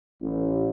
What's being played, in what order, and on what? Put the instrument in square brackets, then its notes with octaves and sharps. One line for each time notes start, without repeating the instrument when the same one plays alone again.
[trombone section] A1